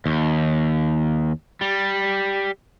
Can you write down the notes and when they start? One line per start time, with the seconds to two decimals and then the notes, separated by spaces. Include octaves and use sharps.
0.06 D#2
1.61 G3